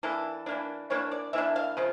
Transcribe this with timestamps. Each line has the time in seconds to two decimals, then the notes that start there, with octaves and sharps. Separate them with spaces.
0.03 E3 A#3 D4 A4
0.46 E3 A#3 D4
0.90 E3 A#3 D4 C#5
1.11 D5
1.33 E3 A#3 D4 E5
1.56 F5
1.77 C#3 F3